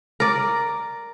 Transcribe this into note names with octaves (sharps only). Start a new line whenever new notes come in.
A#4 D5